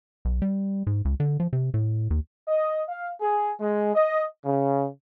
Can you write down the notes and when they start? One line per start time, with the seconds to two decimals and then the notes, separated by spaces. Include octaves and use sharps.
0.25 B1
0.42 G3
0.87 G#2
1.05 C#2
1.20 D3
1.40 F3
1.53 C3
1.74 A2
2.10 D#2
2.48 D#5
2.89 F5
3.21 G#4
3.60 G#3
3.95 D#5
4.45 C#3